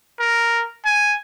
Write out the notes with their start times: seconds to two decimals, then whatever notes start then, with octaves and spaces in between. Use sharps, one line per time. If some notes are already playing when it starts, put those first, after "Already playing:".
0.20 A#4
0.85 G#5